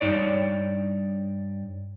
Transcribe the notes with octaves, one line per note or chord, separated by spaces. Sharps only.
G2 D#4 C#5 D5